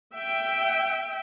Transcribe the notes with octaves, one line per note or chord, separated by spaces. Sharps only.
E5 G5